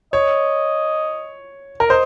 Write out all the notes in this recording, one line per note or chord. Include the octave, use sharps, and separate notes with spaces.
C#5 D#5
A#4
C5 D#5